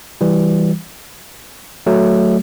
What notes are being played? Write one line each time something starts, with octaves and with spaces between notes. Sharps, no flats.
E3 G3
F#3 A3